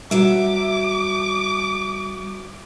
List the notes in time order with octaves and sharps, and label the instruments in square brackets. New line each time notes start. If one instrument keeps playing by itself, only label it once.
[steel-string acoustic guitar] F#3 E5 [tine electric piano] G3 [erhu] D6